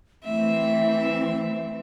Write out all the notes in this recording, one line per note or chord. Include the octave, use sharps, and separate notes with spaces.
E3 A3 C4 E5